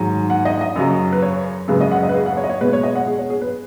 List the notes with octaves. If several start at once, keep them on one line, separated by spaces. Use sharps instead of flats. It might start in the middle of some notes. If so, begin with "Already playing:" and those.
Already playing: G#2 D#3 F#3
F#5
D#5
D#5
F#2 C#3 F#3
B4
C#5
F#2 C#3 G#3 B4
D#5
F#5
D#5
B4
G#4
F#5
C#5
D#5
C#5
B2 G#3 B4
C#5
D#5
F#5
G#4
C#5
G#4
B4